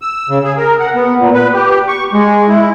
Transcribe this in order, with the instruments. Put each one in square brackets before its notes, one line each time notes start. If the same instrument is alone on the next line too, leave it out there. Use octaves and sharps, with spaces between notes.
[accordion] E6
C#3
G#4
A#4
F#5
B3
A#2
B4
G4
C#6
G#3
E4